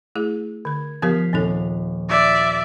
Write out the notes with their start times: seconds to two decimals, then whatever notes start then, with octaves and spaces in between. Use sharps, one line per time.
0.15 A3 E4 G#4
0.65 D3 A#4 G#6
1.02 F3 B3 G4 A#4 F5 B6
1.33 D#1 C4 D#4 A4
2.09 D5 E5